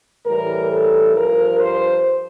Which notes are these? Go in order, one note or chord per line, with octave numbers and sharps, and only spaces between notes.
A2 E3 G3 A#4
A4
G2 F3 A#4
C5